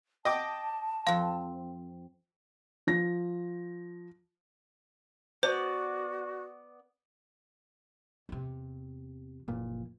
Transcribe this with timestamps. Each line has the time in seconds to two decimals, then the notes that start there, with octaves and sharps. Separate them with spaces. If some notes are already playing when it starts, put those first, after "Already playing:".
0.25 D#5 G5 A5 D6
1.07 F2 C4 F5
2.87 F3 A#6
5.43 B3 F#4 C5 D5
8.29 E2 C3
9.48 F#1 A#2 E3 F3